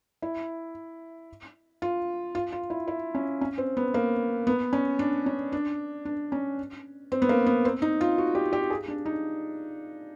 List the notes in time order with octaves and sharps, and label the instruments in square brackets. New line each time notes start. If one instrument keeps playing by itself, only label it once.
[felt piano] E4
F4
F4
F4
E4
E4
C#4
C#4
C4
B3
A#3
B3
C#4
D4
C#4
D4
D4
C#4
C4
B3
A#3
B3
C4
D#4
F4
F#4
G4
G4
G#4
D4
D#4